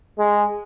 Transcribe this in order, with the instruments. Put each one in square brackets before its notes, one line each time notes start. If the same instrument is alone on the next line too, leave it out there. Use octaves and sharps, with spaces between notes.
[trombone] G#3